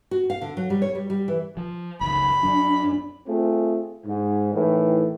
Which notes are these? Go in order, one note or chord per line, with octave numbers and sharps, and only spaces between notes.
F#4
F5
D3
F#3
G3
C#5
G3
G3
E3
F3
F#1 C#2 D#3 B5
F#2 F#3 D4
A3 C4 F4 G#4
G#2
A2 D#3 E3